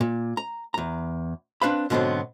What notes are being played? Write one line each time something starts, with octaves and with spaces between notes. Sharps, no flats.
A#2
A#5
E2 A#5
C4 D4 B4 F5 B5
G#2 B2 D3 F#3 B3 C4